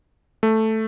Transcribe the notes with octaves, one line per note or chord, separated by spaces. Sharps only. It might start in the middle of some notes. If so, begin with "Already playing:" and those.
A3